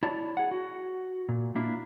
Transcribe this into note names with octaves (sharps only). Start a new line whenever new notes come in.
E4 C#5 D5 A5
G#4 F#5
F#4
A#2
A#3 D4 E4 F4